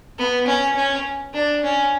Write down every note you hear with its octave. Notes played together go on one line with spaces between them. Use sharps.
B3
C#4
C#4
D4
C#4